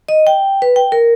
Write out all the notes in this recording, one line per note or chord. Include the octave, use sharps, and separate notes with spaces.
D#5
G5
B4
G5
A#4